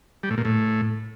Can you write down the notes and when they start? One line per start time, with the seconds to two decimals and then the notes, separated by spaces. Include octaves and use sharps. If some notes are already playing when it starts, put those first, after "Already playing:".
0.23 G3
0.31 A2
0.38 A#2
0.45 A2